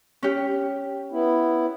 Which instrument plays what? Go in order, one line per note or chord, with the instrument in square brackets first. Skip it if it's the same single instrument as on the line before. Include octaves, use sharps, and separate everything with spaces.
[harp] C#4 G4
[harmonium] B3 E4